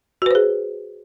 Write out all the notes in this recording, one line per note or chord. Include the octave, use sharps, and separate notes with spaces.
F#4 G#4 B4 C5